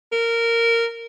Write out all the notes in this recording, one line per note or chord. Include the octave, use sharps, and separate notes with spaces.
A#4